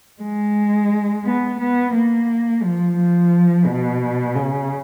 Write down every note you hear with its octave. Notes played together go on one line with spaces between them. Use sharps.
G#3
B3
B3
A#3
F3
F3
B2
C#3